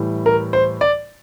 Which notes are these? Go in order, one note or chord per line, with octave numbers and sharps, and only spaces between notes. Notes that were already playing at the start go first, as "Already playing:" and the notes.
Already playing: A2 E3 G3
A#4
C5
D5